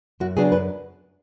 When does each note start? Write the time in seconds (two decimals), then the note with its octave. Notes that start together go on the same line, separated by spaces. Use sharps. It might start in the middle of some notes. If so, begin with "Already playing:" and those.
0.20 F#2 F#4
0.37 C#3 F#3 B3 D4 G#4
0.52 F#2 B4